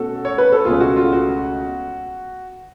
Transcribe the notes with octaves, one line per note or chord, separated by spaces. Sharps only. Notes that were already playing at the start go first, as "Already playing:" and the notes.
Already playing: B2 A3 C#4 F#4 A4
C#5
B4
A4
C#2 B2 A3 C#4 F4 G#4
F#4
F4
F#4